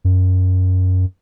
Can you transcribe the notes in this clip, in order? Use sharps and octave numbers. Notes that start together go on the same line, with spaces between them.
F#2